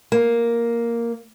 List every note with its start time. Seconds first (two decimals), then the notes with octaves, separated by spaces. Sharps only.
0.12 A#3